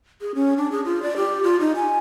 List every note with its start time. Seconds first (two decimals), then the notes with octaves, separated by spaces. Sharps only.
0.21 G#4
0.35 C#4
0.57 D4
0.72 G#4
0.85 F4
1.02 D5
1.17 G4
1.43 F4
1.60 D#4
1.76 G#5